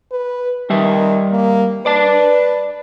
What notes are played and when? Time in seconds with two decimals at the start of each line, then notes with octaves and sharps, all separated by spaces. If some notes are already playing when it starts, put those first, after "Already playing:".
0.12 B4
0.70 D#3 G3 E5
1.31 A#3
1.86 B4 D5 A5